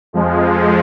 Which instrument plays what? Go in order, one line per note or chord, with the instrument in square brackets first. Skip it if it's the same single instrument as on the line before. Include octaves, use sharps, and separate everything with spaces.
[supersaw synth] F2 F3 G#3